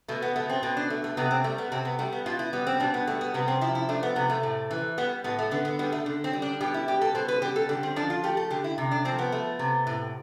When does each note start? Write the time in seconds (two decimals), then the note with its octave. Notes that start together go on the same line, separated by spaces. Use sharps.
0.08 B2 A3
0.22 B3
0.36 A3 B3
0.50 C4
0.63 B2 C4
0.77 D4
0.90 A3
1.04 A3
1.17 C3 B3
1.31 C4
1.44 G3 A3
1.58 B3
1.72 C3 C4
1.85 B3
1.99 G3 A3
2.12 B3
2.26 B2 F4
2.39 E4
2.53 G3 B3
2.67 C4
2.80 B2 D4
2.94 B3
3.07 G3 A3
3.21 B3
3.34 C3 B3
3.48 C4
3.61 F3 E4
3.75 E4
3.89 A3 D4
4.03 B3
4.16 C3 B3
4.30 A3
4.43 A2
4.71 E3
4.98 G3 B3
5.24 A2 B3
5.39 A3
5.51 D3 B3
5.65 B3
5.79 G3 B3
5.92 A3
6.06 D3
6.24 C4
6.33 G3
6.42 D4
6.60 B2 G4
6.74 E4
6.88 G3 G4
7.01 A4
7.15 B2 C5
7.28 B4
7.42 G3 G4
7.56 A4
7.69 D3 G4
7.83 C4
7.96 F3 D4
8.10 F4
8.23 A3 G4
8.37 A4
8.50 D3 G4
8.64 E4
8.78 C3
8.91 D4
9.05 F3 C4
9.19 B3
9.32 A3
9.59 C3
9.87 A2